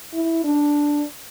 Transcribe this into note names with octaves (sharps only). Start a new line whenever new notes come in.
E4
D4